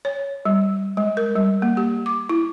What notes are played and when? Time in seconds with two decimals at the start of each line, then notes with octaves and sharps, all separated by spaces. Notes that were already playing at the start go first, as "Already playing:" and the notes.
0.05 C#5
0.45 G3
0.97 G#3
1.17 A#4
1.35 G3
1.62 A#3
1.77 G4
2.06 D6
2.29 E4